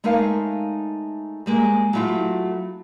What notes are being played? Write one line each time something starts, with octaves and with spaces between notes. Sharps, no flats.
G#3 A3 D#4 A#4 C#5 F5
G3 G#3 A#3
F#3 G3 A3 E4 F4 G4